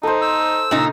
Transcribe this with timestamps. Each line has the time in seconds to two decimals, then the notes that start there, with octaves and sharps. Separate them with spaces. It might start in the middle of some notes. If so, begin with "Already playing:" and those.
0.03 D#4 A4 C5
0.22 E6
0.71 A#2 C#3 D#4